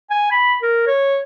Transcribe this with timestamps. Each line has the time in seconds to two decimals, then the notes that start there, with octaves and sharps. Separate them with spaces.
0.10 G#5
0.31 B5
0.62 A#4
0.87 C#5